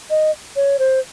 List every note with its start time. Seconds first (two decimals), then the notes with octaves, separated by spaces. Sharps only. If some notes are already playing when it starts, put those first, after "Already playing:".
0.10 D#5
0.56 C#5
0.79 C5